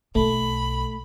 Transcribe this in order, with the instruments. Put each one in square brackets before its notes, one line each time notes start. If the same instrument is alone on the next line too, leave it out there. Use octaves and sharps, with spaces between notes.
[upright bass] B1 [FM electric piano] A3 [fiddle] B5